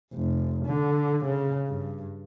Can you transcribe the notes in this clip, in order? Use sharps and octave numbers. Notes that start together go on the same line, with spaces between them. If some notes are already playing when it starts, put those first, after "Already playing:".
F1
D3
C#3
G2